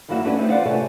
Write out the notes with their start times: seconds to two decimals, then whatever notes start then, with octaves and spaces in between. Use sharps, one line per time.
0.08 G2 E3 F#3 A#3 E4 F#4
0.24 A3 C#4 D4 F#4 A4 B4
0.38 E3 A3 B3 C4 D4 D#4
0.50 F4 G#4 B4 D5 F5 F#5
0.65 C3 A3 A4 C#5 G#5